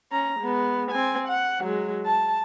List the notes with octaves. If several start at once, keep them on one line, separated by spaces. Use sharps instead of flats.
C#4 A#5
G#3 B3
C4 G#5
F#5
F#3 G#3
A5